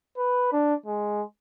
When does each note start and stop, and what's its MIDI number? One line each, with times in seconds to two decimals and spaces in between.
0.18 0.51 71
0.52 0.74 62
0.86 1.22 56